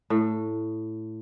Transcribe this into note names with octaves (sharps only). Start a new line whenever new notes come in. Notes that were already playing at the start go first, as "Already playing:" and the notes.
A2